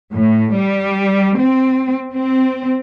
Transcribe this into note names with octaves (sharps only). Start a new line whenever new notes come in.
A2
G3
C4
C4